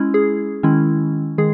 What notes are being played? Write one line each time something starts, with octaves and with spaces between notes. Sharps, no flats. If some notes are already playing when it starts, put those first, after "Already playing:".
Already playing: G#3 C#4 E4
G#4
D#3 G#3 C#4 E4
D#3 G#3 G#4